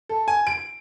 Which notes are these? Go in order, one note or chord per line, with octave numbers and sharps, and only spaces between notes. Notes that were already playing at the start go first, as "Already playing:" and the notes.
A4
G#5
D7